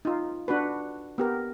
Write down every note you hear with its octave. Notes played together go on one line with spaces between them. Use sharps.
D#4 F4
D4 F#4 B4
B3 G4 A#4